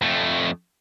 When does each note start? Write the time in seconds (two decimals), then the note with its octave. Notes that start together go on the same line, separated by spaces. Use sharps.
0.02 F2 A3